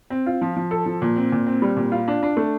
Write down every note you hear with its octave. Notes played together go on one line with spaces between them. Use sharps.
C4
F4
F3
F3
A4
F3
A#2
C4
A#2
C4
G3
A#2
F4
D4
D4
A3